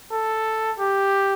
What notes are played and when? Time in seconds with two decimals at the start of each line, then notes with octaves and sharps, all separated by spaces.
0.12 A4
0.80 G4